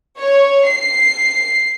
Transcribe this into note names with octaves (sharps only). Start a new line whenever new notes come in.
C#5
C7